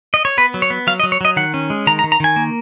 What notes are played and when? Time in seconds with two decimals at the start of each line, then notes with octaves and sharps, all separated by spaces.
0.14 D#5
0.25 C#5
0.38 B3 B4
0.54 F#3
0.62 C#5
0.70 B3
0.87 F#3 F5
1.00 D#5
1.03 F#3
1.12 C#5
1.21 F#3 D#5
1.36 D#3 F#5
1.54 C#4
1.70 G#3
1.87 D#3 A#5
1.99 A#5
2.04 D#3
2.12 A#5
2.20 D#3 G#5
2.36 A#3